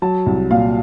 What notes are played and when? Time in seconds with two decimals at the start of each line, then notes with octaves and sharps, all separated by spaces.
0.02 F#3 A5
0.26 C2
0.51 A#2 F5